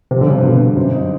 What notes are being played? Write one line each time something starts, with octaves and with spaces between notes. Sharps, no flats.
C3 F3
D3
G2 C#3
C3
B2 D3
G2
F#2 C4
D#4